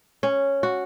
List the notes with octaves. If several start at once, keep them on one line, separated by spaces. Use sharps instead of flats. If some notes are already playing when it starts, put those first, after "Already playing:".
C#4
F#4